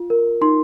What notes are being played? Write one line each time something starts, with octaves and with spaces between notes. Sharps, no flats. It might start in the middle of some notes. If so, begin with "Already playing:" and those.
Already playing: F4
A#4
D#4 C6